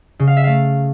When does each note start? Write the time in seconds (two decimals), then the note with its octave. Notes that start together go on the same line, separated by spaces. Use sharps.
0.19 C#3
0.27 F5
0.37 E5
0.44 A3 F5